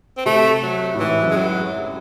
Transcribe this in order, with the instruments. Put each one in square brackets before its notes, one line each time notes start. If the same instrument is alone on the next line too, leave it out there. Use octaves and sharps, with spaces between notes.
[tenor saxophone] C4
[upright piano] C3 [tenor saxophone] A3
[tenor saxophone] F#3
[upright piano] A2
[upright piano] G#2 [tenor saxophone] E3
[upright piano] F#2
[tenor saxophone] G#3
F#3